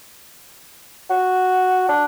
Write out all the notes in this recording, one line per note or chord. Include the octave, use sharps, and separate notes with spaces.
F#4
D4